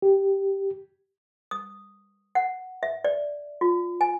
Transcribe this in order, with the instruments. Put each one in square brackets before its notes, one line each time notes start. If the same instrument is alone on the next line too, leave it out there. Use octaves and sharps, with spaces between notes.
[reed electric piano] G4
[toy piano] D#6
F#5
E5
D5
F4
G#5